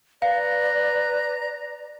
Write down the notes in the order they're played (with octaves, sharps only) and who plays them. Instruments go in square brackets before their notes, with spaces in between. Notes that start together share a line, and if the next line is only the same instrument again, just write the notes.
[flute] B4 [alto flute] D5 [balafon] F5 [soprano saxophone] A#5